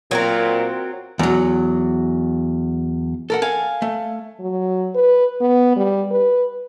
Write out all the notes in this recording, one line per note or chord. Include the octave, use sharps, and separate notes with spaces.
A#2 F#3 C4 A#4
E2 F#3
A4 A#4 F#5
F5 G#5
A3
F#3
B4
B3
G3
B4